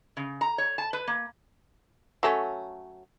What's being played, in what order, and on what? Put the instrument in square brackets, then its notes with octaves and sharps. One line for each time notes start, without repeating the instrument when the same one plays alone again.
[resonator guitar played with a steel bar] C#3
A#5
C#5
A5
B4
A#3
[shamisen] F#3 A3 C#4